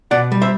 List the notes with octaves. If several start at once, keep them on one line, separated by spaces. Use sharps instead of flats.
B2 D5 F#5
G3
C5 E5